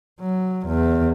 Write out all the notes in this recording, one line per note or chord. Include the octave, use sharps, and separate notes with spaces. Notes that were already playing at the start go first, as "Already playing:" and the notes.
F#3
E2